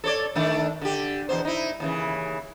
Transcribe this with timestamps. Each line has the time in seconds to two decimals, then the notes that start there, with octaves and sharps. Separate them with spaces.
0.04 A4 C#5 D5
0.35 D#3 A3 D4
0.81 D3 G4
1.29 E2 B2 C5
1.45 D#4 E4
1.80 D#2 C#3 E3